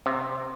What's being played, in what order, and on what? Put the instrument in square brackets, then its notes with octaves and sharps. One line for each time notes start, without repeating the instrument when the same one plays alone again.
[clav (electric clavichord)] C3